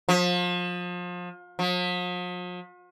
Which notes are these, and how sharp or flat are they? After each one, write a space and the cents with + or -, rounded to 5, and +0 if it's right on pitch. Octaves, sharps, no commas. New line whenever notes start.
F3 +30
F3 +45